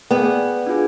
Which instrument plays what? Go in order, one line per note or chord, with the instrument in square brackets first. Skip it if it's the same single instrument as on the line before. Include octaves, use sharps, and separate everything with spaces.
[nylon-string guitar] B3 [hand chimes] G#4 B4 D5 G5
[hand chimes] D4 F4 G#4